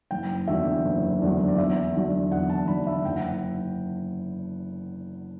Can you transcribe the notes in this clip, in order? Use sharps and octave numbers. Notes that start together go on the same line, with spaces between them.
F#1 G5
E2 D3 F#3 E5
F#1
E2 D3 F#3
D5
E2 E5
D3 F#3
E2 F#5
A5
D3 F#3 B5
E5
F#1 G5
F#5